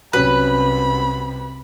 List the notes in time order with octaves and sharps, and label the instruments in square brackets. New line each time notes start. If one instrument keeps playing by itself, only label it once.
[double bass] C2 C3 [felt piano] F#3 C#4 [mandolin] B4 [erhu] B5